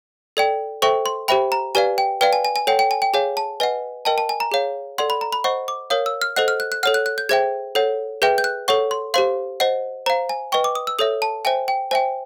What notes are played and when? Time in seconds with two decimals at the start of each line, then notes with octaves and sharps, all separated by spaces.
0.37 A4 D5 G5
0.82 A4 C5 E5 G5 C#6
1.06 C6
1.28 G4 C5 E5 G5 B5
1.52 A#5
1.75 G4 B4 D5 F5 G#5
1.98 G5
2.21 B4 D5 F5 G5
2.33 G#5
2.45 G#5
2.56 G#5
2.67 A4 C#5 F#5 G5
2.79 G5
2.91 G#5
3.02 G5
3.14 G#4 C#5 F5 G#5
3.37 A5
3.60 B4 D#5 F#5 G#5
4.05 A#4 D#5 G5 A5
4.18 A5
4.29 G#5
4.40 A#5
4.52 G#4 C#5 F5
4.98 A4 D5 F#5 C6
5.10 B5
5.21 A#5
5.33 B5
5.44 C5 D#5 F#5 C#6
5.68 D6
5.90 A#4 C#5 F5 D#6
6.06 E6
6.22 F6
6.36 A4 C5 D#5 F#5 F#6
6.48 F6
6.60 F#6
6.72 F#6
6.83 A4 C#5 F#5 F6
6.94 F#6
7.06 F#6
7.18 G6
7.29 G#4 C5 E5 G5 G#6
7.75 A4 C#5 F#5
8.22 G#4 B4 E5 G5 G6
8.38 G6
8.44 F#6
8.68 A4 C#5 F#5 C#6
8.91 C6
9.14 G4 C5 F5 C6
9.60 C5 D#5 F#5
10.06 C5 F5 A#5
10.29 G#5
10.52 B4 D#5 G5 C#6
10.64 D6
10.75 D#6
10.87 E6
10.99 A4 C#5 E5 D#6
11.22 A5
11.45 C5 E5 G5 G#5
11.68 G5
11.91 C5 E5 G5 G#5